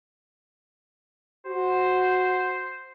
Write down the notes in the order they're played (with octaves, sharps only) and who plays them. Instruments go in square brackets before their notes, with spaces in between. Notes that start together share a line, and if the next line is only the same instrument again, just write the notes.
[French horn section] F#4 [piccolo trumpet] C5